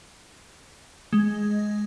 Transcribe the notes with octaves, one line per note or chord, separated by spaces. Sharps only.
G#3